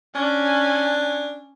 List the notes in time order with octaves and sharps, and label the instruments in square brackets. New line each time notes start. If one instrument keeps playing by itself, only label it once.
[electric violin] C#4 G#5 [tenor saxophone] D4